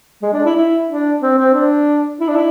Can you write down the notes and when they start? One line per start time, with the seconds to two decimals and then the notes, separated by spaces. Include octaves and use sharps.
0.22 G#3
0.33 D4
0.44 E4
0.55 E4
0.89 D4
1.22 C4
1.37 C4
1.54 D4
2.20 E4
2.28 D4
2.36 E4